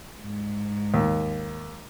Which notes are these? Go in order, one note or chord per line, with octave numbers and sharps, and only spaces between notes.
G#2
D#2